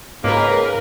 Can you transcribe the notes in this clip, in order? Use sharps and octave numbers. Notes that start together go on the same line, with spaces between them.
C#2 G#2 A#3 A#4 B4